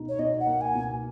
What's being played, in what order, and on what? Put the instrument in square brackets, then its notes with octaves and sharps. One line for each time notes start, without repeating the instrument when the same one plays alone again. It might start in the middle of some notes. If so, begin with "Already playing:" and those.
Already playing: [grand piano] B2 A#3 D#4
[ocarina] C#5
[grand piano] B2 [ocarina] D#5
[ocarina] F#5
[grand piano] A#3
[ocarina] G#5
[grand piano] B2